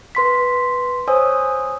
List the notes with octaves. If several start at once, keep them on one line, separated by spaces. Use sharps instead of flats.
B4 C6 B6
C5 C#5 G#5 D#6 E6